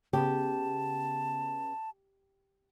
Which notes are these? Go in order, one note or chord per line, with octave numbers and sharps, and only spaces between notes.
C#3 B3 G4 A5